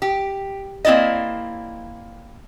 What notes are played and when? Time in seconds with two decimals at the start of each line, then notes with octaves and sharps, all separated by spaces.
0.02 G4
0.85 A#3 C4 E4 D5 D#5